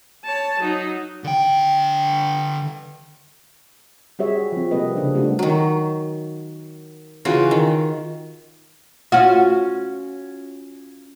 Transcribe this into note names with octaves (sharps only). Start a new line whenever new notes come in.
C#5 A5
F#3 D#4
D3 G5
G3 F#4 G#4 C#5 E5
F3 C4
C3 G3 A#3 A4 B4 D#5
C#3 D4
G3 A3 D4 F#4
D#3 F#3
C#3 E3 F4 F#4
D#3
C#4 F4 F#4